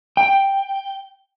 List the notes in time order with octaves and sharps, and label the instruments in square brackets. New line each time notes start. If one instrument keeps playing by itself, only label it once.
[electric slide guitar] G5